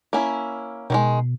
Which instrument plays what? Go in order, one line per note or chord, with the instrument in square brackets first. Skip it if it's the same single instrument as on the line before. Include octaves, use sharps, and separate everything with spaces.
[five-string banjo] A#3 C#4 E4
[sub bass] B2 [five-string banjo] D#3 G3 G#3